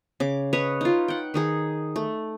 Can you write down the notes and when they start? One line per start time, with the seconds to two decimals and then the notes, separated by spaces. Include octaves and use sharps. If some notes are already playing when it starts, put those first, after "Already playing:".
0.20 C#3 D6
0.53 B4 C#5 D#5
0.81 D#4 F4
1.08 F#5 G5
1.34 D#3 D#4 G#4
1.96 A3